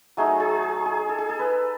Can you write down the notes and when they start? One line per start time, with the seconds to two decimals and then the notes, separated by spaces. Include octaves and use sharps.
0.17 F#3 A3 D#4 G#4
0.40 G#4
0.63 G#4
0.86 G#4
1.09 A4
1.18 G#4
1.29 A4
1.39 B4